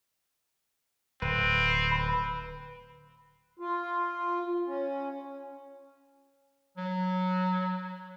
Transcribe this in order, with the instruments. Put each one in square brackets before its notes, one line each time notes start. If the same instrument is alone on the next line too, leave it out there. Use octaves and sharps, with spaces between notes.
[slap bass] D1 [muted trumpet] C4 [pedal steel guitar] B4
[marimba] B5
[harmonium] F4
C#4
[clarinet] F#3